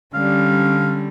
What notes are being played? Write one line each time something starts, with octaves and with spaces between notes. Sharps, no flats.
D3 G3 C#4 F5